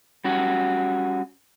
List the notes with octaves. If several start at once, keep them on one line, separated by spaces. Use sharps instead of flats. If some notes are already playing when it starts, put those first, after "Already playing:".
G3 C#4 F#4